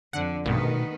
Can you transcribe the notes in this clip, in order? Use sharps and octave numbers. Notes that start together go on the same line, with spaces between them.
F2 D3 F#5
A#1 G2 B2 D#3 A3 B3